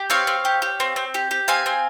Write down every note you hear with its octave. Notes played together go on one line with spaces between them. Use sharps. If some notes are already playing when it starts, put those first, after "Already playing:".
Already playing: G4
C4 C#5 F5
C4
G4
G4
C4
C4
G4
G4
C4 F5 G#5
C4